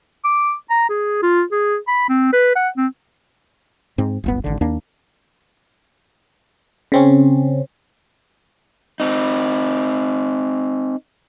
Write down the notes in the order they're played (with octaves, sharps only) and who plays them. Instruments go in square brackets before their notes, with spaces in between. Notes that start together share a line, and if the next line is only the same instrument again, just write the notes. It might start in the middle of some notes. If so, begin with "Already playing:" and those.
[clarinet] D6
A#5
G#4
F4
G#4
B5
C4
B4
F#5
C4
[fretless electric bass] G#2 C4
D1 G1 B3
G#1 D3
D#2 A#3 D4
[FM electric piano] C#3 C4 C#4
[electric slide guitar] C4 D#4